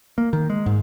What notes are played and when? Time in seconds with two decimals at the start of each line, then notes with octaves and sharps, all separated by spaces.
0.18 A#3
0.33 D#3
0.50 G#3
0.66 G#2